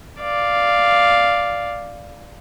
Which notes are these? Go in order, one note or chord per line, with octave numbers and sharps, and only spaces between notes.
D5 F5